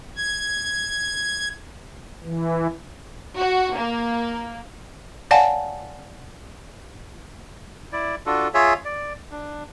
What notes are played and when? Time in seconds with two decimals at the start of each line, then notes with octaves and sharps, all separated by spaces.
0.16 G#6
2.24 E3
3.37 F#4
3.76 A#3
5.31 C#5 D5 F5 F#5 G#5 A5
7.92 E4 D5
8.26 D4 F4 F#4 A4
8.54 F4 G#4 C#5 E5
8.85 D5
9.31 D4